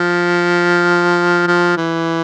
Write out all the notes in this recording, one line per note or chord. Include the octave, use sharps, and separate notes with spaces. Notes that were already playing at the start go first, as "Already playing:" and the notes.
Already playing: F3
F3
E3